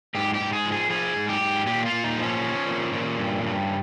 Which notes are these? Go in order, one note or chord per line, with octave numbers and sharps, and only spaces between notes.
G#2 G4
G4
G#2
G#4
F3
G#4
F3 G#4
G#2
G4
G#2
A#2 G4
F4
A#2
D#4
F3
C#4
F3
A#2
A#2
G2
G2